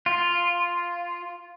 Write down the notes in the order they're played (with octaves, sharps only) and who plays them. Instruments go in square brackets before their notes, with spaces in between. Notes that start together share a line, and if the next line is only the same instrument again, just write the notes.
[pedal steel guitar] F4